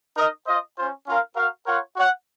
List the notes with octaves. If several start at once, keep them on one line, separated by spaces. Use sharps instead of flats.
D#4 A#4 D#5
F4 C5 D#5
C#4 F4 C5
C#4 F4 A#4 F5
F#4 A#4 F5
F4 A#4 C#5 F#5
F#4 C#5 F#5